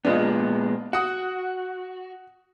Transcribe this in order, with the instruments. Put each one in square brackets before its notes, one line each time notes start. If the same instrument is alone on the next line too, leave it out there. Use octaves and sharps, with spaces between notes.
[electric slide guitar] A#2 G#3 B3 [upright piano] D4 F4 D#5
[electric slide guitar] F#4 [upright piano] F#5 D#6